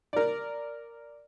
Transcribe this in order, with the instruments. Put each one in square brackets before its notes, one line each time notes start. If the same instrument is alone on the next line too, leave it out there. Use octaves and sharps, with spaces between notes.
[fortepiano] A#4 D5